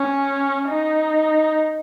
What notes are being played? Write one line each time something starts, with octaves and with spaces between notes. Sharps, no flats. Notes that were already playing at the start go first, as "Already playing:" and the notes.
Already playing: C#4
D#4